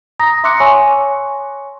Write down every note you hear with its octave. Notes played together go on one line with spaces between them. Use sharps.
A#5 D#6 A#6
E5 C6 D6 E6 F#6 C#7
C#5 G#5 C6 C#6